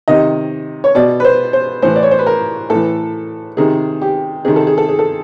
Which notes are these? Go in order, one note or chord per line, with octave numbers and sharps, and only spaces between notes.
C3 D#3 D#5
C#5
B2 D5
B4
C5
C5
A2 E3 C5
D5
C#5
C5
B4
A#4
A2 A4
E3
C3 D#3 G#4
G4
C3 D#3 G#4
A4
G#4
A4
G#4
A4